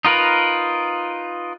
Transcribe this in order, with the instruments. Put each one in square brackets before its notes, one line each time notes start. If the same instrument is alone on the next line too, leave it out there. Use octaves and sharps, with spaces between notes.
[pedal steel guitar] D#4 F4 A#4 B4